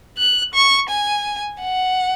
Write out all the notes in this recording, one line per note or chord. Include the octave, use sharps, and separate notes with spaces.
F#6
C#6
G#5
F#5